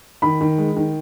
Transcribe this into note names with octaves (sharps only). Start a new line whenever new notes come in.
D#3 B5
D#3
G#3
D#3